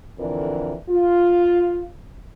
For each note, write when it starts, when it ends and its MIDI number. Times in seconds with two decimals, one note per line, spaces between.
0.19 0.75 41
0.19 0.75 50
0.19 0.75 52
0.19 0.75 70
0.19 0.75 74
0.90 1.84 65